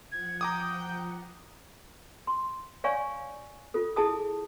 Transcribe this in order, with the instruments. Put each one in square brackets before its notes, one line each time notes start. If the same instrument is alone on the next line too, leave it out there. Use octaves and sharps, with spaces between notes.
[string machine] F3 F#5 [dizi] G#6
[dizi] G5 [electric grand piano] A#5 D6 D#6
[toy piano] C6
C#5 D5 F5 G#5 C#6
F4 A4
E4 G#4 A5 D#6